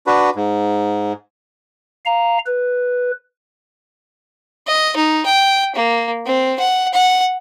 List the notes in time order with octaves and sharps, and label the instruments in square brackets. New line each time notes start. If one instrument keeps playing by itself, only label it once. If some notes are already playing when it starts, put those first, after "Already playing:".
[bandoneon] D4 F#4 B4
G#2
[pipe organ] F5 A#5
B4
[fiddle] D#5
D#4
G5
A#3
C4
F#5
F#5